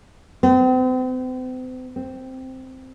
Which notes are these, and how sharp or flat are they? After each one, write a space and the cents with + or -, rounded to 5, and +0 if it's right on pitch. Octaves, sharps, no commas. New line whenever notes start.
C4 -40
C4 -5